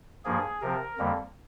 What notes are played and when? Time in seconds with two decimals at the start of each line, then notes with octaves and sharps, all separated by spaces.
0.25 G2 F3 A#3 G#4
0.62 C3 F3 C4 A#4
0.98 F2 D3 G3 A#3